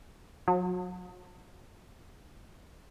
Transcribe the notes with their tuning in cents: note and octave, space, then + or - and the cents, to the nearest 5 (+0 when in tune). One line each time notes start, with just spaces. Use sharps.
F#3 -30